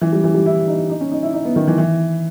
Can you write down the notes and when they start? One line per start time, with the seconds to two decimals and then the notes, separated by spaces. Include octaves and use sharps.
0.01 E3
0.12 G3
0.24 E3
0.34 G3
0.46 E4
0.68 D#4
0.90 D#4
1.01 C#4
1.12 D#4
1.23 E4
1.34 D#4
1.45 B3
1.56 D#3
1.67 E3
1.78 E3